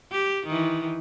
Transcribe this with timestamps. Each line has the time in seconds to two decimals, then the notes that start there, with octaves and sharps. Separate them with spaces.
0.12 G4
0.46 D#3 E3